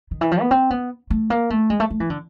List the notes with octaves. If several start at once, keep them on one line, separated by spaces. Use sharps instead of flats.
D#3
E3
F3
B3
C4
B3
A3
A#3
A3
G#3
A3
A3
E3
D3